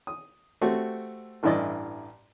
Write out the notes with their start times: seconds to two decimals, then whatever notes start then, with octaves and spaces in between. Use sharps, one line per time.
0.07 D#6
0.62 A3 C4 F#4 G4
1.43 A1 G2 E3 E4 D5 D#5